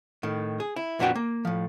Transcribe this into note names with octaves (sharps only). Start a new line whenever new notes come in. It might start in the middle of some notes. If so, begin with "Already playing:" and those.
A2 D#3
G#4
E4
F2 A#2 B3 D4 F#4 G5
A#3
A2 F3